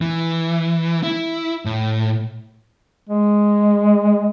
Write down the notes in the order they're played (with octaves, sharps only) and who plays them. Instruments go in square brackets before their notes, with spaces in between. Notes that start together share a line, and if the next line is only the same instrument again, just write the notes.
[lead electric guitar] E3
E4
A2
[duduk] G#3